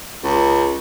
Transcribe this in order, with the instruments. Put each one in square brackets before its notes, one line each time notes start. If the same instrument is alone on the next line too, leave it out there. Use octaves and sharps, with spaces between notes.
[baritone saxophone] C#2